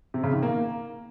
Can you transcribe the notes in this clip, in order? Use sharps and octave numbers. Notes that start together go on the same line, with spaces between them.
C3
C#3
D#3
A#3